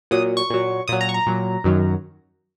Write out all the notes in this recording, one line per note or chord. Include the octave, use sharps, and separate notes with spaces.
A#2 F#3 D#6
C#6
A#2 F#3
A#2 F#3 D#6
A#5
C#6
A#5
A#2 F#3
F#2 D#3 F#3